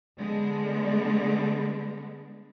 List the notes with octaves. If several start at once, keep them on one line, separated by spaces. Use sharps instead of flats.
D3 G#3 B3